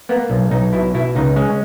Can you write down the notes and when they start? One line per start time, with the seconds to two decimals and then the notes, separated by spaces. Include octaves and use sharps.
0.09 A#3 B3
0.30 B1
0.51 B1 D#4
0.73 B2 E4
0.94 B2 E4
1.15 C#2 D#4
1.36 G#3 C#4